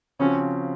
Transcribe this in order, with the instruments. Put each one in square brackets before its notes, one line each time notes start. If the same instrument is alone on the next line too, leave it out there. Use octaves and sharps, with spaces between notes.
[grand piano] C#3 F3 C4 F#4 [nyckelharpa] C#4